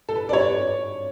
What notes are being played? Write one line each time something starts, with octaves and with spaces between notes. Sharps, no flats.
A4
B4
D5
C#5